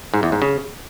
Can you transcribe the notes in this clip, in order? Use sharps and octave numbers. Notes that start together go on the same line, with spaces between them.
G#2
E2
G#2
C#3